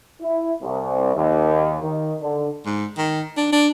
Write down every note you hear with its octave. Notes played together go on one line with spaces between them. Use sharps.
E4
C2
D#2
D#3
D3
G#2
D#3
D4
D4